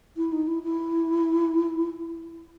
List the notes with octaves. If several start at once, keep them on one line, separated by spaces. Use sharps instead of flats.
E4
D#4
E4
E4